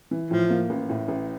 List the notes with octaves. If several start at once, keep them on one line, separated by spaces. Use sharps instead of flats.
E3
A2 F3
A#3
A1
A2
A1